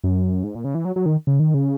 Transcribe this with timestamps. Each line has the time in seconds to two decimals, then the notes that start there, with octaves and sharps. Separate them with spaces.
0.04 F#2
0.44 G#2
0.55 A#2
0.64 C#3
0.75 E3
0.85 F#3
0.96 F#3
1.06 D#3
1.27 C#3
1.40 D#3
1.54 C#3